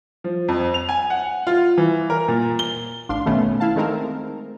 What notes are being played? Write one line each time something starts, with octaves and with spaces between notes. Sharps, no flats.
F3
F2
F7
G#5
F#5
F4
E3
A#4
A#2
G7
A1 D4 F5 C6
B2 D#3 A3 B3 C#4
E4 F5 A5
D#3 G#3 A3 C4 D#4 A#4